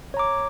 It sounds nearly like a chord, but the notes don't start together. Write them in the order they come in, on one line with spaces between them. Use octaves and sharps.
C#5 A#5 D6